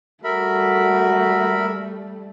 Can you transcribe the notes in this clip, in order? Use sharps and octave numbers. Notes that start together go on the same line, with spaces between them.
G3 A3 F#4 A#4 E5 B5